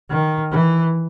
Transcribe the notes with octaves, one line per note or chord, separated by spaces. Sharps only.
D#3
E3